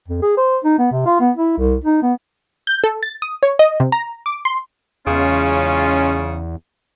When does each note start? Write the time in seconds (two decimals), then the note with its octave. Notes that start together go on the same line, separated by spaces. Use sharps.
0.08 F2
0.22 G#4
0.37 C5
0.64 D#4
0.78 B3
0.91 C3
1.06 F4
1.20 B3
1.36 E4
1.58 C2
1.84 D#4
2.02 B3
2.67 G6
2.84 A4
3.03 A6
3.22 D#6
3.43 C#5
3.59 D#5
3.80 C3
3.92 A#5
4.26 D6
4.45 C6
5.07 E2 C#3 G#3 C#4 F4